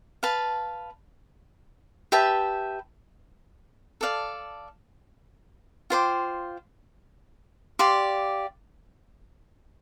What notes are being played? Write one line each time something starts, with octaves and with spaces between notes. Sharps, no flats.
B4 F5 A5
G4 B4 E5 A5
A4 D5 F5
F4 C5 G5 D6
G4 D5 F5 C6